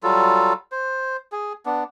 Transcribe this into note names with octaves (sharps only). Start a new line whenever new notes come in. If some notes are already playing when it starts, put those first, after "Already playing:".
F#3 G3 F4 A4
C5
G#4
B3 D4